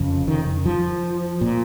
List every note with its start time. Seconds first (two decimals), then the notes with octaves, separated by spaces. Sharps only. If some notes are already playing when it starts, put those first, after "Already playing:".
Already playing: F1 F2 C#3
0.28 D#3
0.66 F3
1.41 A#2